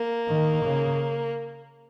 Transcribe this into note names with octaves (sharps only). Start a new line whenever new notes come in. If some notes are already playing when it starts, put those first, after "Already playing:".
Already playing: A#3
D#3
C#3